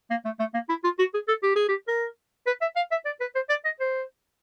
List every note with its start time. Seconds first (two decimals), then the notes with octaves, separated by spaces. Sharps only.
0.10 A#3
0.25 A3
0.39 A3
0.54 A#3
0.69 E4
0.84 F4
0.99 F#4
1.14 G#4
1.28 A4
1.43 G4
1.56 G#4
1.69 G4
1.88 A#4
2.46 B4
2.61 E5
2.76 F5
2.91 E5
3.06 D5
3.20 B4
3.35 C5
3.50 D5
3.65 D#5
3.80 C5